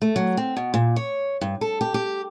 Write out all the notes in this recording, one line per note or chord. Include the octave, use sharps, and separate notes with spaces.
A3
F#3
C4
B2
A#2
C#5
G2
A4
G4
G4